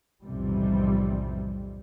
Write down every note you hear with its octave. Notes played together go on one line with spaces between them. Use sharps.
B1 F2 A2 C3 E3 G3